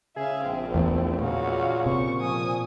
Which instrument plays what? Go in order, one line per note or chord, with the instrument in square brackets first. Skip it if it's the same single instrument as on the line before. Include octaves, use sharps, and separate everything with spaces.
[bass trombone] C#3 [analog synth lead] G#4 [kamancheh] E5 F5
[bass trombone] A#1 [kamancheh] C4
[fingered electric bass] E2 E3 [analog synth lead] A3
[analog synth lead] A#2 [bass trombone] C#3 [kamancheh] F#4 F5
[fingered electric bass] C3 [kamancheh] C5 C#6
[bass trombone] F3 [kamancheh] G#5 D#6